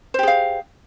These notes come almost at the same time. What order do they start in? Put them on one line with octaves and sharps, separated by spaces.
C5 G4 G#4 F5